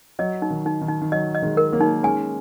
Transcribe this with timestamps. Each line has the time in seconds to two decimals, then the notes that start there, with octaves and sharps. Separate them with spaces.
0.19 F#3 D#5
0.42 D#4
0.50 D#3
0.66 D#4
0.81 D#3
0.88 D#4
1.01 D#3
1.12 F#3 D#5
1.35 D#5
1.42 D#3 G#3
1.57 A#4
1.72 F#3 A#3
1.81 D#4
2.03 G#3 C#4 G#5